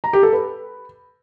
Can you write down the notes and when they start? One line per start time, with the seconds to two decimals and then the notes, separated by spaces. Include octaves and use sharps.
0.04 A#5
0.13 G4
0.23 A4
0.33 B4